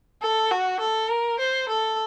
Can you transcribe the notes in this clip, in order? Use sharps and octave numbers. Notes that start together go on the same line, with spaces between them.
A4
F#4
A4
A#4
C5
A4